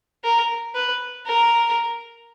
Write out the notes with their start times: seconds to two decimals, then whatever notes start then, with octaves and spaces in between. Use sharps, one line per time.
0.24 A#4
0.75 B4
1.27 A#4